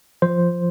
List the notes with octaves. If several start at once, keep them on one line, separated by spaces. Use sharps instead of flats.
F3 C5